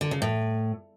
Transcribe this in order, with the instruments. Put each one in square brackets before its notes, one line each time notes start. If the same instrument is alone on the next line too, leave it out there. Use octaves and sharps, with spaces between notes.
[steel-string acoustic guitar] D3
C#3
A2